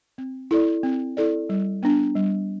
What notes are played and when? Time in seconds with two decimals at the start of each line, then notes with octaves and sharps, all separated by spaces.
0.18 C4
0.51 E4 A4 D5
0.83 C4
1.17 E4 A4 D5
1.49 G3
1.83 B3 D4
2.16 G3